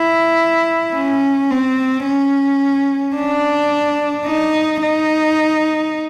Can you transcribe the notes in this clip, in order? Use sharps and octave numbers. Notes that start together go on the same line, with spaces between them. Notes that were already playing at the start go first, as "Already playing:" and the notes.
Already playing: E4
C#4
C4
C#4
D4
D#4
D#4